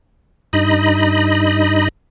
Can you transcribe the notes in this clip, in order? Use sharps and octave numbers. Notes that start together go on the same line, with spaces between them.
G2 D#4 D#5 B5